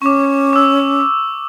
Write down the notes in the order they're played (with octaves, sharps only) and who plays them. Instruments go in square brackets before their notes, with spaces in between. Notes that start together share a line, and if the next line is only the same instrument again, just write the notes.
[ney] C#4 [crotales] C#6 D6
[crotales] D6 E6